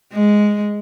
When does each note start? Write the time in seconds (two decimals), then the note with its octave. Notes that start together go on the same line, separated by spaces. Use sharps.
0.13 G#3